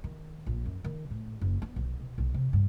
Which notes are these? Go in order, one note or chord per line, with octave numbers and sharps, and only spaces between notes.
D#3
A#1
F#2
D#3
A2
F#1
B3
B1
B2
B1
C3
G2